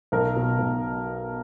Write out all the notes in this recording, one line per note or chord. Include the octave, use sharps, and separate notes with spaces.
B1 A#4
B2
B1